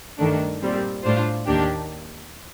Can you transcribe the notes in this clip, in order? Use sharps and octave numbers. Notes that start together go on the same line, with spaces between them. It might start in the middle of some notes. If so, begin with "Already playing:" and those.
G2 D#3 A3 D4
A#2 G3 C4
A2 G3 D4 F4 C5
D#2 D#3 A#3 D4 G4